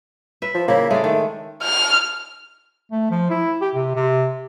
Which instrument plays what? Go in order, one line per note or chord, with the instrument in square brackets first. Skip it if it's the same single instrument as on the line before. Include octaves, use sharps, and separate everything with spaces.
[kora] B4 E5
[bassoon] F3
[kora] C#3 E4 [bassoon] A#3
[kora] G#3 D5 [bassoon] A3
[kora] D#3 [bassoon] A3
[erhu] F6
[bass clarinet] A3
F3
E4
G4
C3
C3